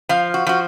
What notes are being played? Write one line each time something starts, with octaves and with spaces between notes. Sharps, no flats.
F3 F5
F#4
F3 F#4